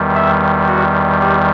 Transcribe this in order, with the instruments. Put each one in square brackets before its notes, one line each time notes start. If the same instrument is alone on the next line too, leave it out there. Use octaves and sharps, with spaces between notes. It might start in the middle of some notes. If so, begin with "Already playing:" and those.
Already playing: [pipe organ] E2 D#3 G3
E5
F#4
G4